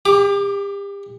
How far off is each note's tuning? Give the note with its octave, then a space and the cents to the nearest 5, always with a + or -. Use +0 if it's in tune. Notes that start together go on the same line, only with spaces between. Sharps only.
G4 +35 D6 +0